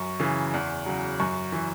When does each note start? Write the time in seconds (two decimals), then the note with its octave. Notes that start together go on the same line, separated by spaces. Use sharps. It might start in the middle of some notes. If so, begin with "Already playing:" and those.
Already playing: F#2 C#6
0.20 C#3 E3
0.54 E2
0.86 C#3 F#3
1.20 F#2 C#6
1.52 E3